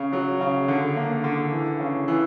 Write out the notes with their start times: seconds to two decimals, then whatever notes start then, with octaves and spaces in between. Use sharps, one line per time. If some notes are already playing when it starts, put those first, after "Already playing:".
Already playing: C#3
0.13 F#3
0.41 C#3
0.68 D3
0.96 A#3
1.24 D3
1.52 E3
1.80 C#3
2.08 E3